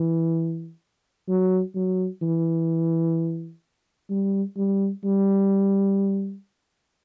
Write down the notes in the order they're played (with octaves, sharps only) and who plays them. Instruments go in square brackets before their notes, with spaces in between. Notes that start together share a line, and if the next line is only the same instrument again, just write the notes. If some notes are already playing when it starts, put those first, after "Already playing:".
Already playing: [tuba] E3
F#3
F#3
E3
G3
G3
G3